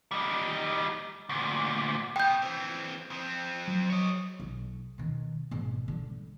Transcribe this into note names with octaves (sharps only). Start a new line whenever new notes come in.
G3 D#4
D2 A#2
B2 G5 G6
E3 C4
F2 C4
F#3
C#5 D#5
B1
B2 D#3
G#1 B2
D3 G3